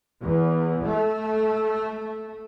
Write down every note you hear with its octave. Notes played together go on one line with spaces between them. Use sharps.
E2
A3